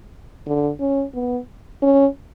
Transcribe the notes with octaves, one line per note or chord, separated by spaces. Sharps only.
D3
C#4
B3
C#4